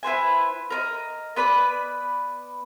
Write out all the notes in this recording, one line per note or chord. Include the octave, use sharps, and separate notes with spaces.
E4 B4 C5 G#5
A#4 B4 D#5
B3 B4 D5 B5